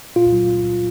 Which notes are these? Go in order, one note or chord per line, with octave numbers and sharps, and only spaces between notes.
A#2 F4
F#3